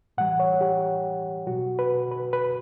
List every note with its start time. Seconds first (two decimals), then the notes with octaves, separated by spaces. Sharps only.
0.18 A2 E3 G3 F#5
0.40 C#5
0.61 G4
1.47 B2 F#3 F#4
1.79 B4
2.11 B4
2.33 B4